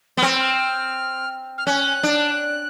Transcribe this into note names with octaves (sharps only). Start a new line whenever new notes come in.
B3
C4 F6
E6
F6
F6
C#4 F#6
D4